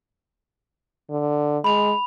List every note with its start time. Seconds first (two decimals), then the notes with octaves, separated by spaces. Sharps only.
1.10 D3
1.64 G#3 B5 F7